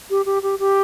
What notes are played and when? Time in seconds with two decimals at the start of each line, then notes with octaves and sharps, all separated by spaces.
0.10 G4
0.26 G4
0.42 G4
0.59 G4